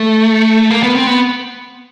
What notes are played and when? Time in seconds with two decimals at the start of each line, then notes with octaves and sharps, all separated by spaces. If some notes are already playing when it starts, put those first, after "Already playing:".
Already playing: A3
0.70 A#3
0.83 B3
0.95 C4
1.07 B3